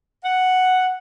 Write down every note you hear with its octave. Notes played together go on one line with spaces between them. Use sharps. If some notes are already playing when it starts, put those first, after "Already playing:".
F#5